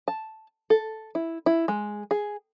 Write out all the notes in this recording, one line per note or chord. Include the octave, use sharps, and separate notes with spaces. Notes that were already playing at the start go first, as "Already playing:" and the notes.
A5
A4
E4
E4
G#3
G#4